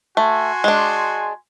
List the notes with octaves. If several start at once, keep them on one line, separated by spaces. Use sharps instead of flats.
A3 F#4 G#5 C6
G#3 D4